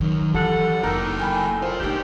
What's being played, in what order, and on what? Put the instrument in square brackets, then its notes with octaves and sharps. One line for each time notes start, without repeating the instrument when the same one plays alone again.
[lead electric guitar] F#2 [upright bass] D#3
[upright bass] E3 [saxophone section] G3 F#5 [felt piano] A4
[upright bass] F1 [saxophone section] A2 D#3 D#4 [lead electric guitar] F#3 A#3 [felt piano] A#4 E6
[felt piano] G5 G#5 B5
[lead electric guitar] F4 A#4 [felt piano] C5
[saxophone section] G2 G4 [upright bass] A3 D#4 [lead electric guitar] D4 A#4